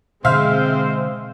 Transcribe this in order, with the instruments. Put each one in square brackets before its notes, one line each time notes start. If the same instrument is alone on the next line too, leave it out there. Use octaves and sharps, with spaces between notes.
[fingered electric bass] B2 D3 [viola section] G#3 C4 [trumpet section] C5 [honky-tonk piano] E5 F5 F6